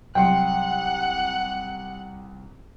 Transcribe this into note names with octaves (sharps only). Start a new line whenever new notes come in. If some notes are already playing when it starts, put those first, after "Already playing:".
C2 F#3 F#5 G5 C6 C#7